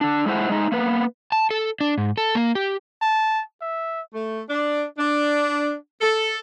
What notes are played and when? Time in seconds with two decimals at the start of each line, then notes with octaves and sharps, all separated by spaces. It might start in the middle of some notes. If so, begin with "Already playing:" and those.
0.01 D3 D4
0.26 G#3 A3 E4 C5 F#5
0.50 G#3 A3 D#4
0.72 A#3 B3 B4
1.32 A5
1.51 A4
1.81 D4
1.98 G#2
2.18 A4
2.35 A#3
2.55 G4
3.02 A5
3.61 E5
4.14 A3
4.50 D4
4.98 D4
6.01 A4